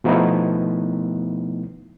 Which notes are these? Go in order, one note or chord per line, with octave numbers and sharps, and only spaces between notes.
B2 F3 A3 B3 D#4 E4